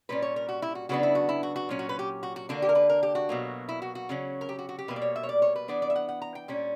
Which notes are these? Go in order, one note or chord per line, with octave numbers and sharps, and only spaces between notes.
A#2 G3 C#4 B4
C#5
A#4
F#4
E4
F#4
C#3 F#3 B3 D4 F#4
E4
F#4
E4
F#4
F#4
A#2 F#3 C#4
F#4
B4
G4
F#4
F#4
D3 A#3 D4 F#4
G4
A#4
B4
A#4
G4
F#4
B2 F#3 A#3
E4
F#4
F#4
C#3 F#3 C#4
A#4
G4
F#4
F#4
G4
B2 G3 A#3 B4
D5
C#5
E5
C#5
D5
C#5
B4
E3 B3 D4 D5
D5
E5
F#5
F#5
A#5
G5
A#2 G3 C#4